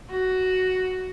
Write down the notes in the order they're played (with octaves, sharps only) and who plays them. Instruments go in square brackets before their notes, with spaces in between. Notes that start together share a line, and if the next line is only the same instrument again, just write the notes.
[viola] F#4